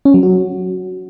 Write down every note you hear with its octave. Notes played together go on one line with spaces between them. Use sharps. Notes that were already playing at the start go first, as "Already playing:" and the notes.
C#4
F#3
F#4